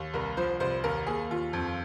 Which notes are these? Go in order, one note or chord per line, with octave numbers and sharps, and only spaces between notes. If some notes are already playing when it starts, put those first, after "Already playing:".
Already playing: D#2
C2 A#4
F3 C5
C2 C5
D#2 A#4
A#3 G#4
D#2 F4
F2